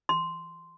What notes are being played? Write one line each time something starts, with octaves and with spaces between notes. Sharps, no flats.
C6